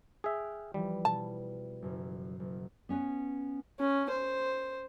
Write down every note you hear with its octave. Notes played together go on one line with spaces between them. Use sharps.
G#4 E5 G5 F6
E3 F3 G3
B2 A5
F#1 F#2
F#1
B3 C#4 B4 C#5
C#4
C5